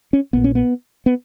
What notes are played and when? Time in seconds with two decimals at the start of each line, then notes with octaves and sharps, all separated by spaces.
0.13 C#4
0.33 A#1 A#2 B3
0.44 C#4
0.55 B3
1.06 B3